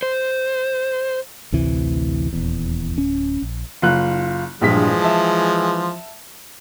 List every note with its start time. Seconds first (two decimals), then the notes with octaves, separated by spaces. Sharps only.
0.02 C5
1.52 A1 D2 C3 E3
2.33 D#1 E2
2.96 D1 C#4
3.42 A#1
3.82 F#1 F4 F#6
4.61 A#1 G2 E3 F3 G#3 B6
5.02 E5 A5